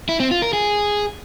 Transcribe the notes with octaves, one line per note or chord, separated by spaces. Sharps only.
E4
C4
F4
A#4
G#4